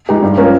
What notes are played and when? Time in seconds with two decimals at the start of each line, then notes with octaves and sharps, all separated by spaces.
0.09 G#3 D#4 G4
0.22 G2
0.38 F3 A#3 C#4